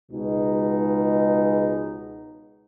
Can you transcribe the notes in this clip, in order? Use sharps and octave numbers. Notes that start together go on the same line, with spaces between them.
C#2 B2 G#3 D#4